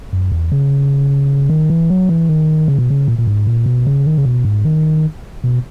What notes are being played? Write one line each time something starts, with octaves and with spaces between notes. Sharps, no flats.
F#2
E2
C#3
D#3
E3
F#3
E3
D#3
C#3
B2
C#3
A#2
A#2
G#2
A#2
B2
C#3
D#3
C#3
B2
G#2
D#3
B2